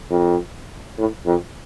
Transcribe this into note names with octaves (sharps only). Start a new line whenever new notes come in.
F2
A2
F2